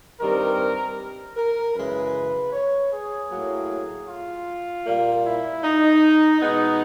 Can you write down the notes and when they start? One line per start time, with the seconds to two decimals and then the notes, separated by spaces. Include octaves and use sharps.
0.20 G2 D#3 G3 C4 A#4
1.37 A#4
1.75 F#2 C#3 E3 G#3 B4
2.52 C#5
2.91 G#4
3.31 A2 F#3 A#3
4.08 F4
4.85 A#2 G3 A#3
5.24 E4
5.64 D#4
6.41 B2 G#3 B3 D#4